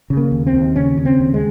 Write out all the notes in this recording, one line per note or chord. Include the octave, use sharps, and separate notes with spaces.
C#3
A#3
D#2
C4
D#2
C#3 C#4
C#3
C4
D#2
G#3